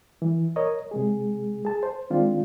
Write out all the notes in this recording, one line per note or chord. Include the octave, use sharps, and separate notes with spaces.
E3
A#4 C#5 D#5
C3 G#3 G#4
G#4 A5
C5
D#3 G#3 C4 D4 F4